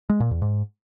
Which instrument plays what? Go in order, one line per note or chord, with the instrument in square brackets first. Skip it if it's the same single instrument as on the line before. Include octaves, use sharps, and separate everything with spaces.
[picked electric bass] G#3
A#2
E2
G#2